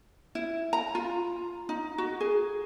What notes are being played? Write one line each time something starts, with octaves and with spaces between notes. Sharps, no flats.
E4
A#5
F4
D#4
F#4
G#4